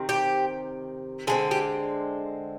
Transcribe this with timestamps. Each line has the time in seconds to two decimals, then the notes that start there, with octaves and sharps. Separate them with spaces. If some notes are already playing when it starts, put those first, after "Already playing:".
Already playing: C3 D#3 C4
0.09 G4
1.27 D3 G#3 C4 G#4
1.51 G4